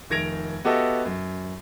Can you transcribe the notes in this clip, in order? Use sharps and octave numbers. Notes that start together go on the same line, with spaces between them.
F1 D#3 G#6 A#6 D7 F7
B3 F#4 G4 A4 D#5 E5
F#2